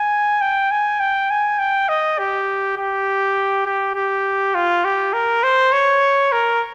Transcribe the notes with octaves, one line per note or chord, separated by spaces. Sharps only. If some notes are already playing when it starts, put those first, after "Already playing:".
Already playing: G#5
G5
G#5
G5
G#5
G5
D#5
G4
G4
G4
G4
F4
G4
A#4
C5
C#5
A#4